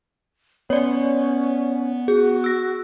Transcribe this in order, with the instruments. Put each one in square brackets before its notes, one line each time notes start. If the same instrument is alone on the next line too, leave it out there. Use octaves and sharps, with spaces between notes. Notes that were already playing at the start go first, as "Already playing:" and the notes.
[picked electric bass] B3 [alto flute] C#4 [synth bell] C#5 D5
[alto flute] F#4 [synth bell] G#4
[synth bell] E6 A#6